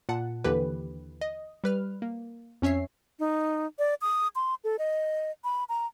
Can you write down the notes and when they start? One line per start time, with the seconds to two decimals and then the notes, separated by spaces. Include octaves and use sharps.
0.09 A#2 F#5 A5
0.44 D#2 D3 E3 G4 B4
1.21 D#5
1.64 G3 B4 F6
2.02 A#3
2.62 F2 C#4 C#5 E5 C7
3.19 D#4
3.79 D5
4.01 D#6
4.35 C6
4.64 A4
4.79 D#5
5.44 B5
5.69 A#5